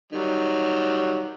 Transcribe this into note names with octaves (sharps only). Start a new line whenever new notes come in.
D#3 F#3 G3